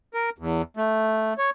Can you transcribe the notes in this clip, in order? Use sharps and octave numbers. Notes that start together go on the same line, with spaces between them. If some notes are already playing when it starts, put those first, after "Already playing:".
A#4
E2
A3
C#5